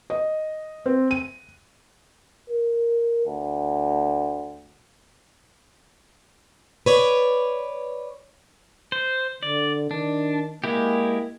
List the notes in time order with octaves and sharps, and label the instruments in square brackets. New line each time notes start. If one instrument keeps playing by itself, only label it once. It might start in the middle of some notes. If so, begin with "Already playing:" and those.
[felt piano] D#5
C4
D#7
[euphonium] A#4
D2
[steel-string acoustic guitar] B4 C#5 D5
[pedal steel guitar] C5
[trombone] D3 [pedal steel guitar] D5
[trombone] D#3 [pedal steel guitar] D4
[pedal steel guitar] G#3 E4 G4 [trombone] A#3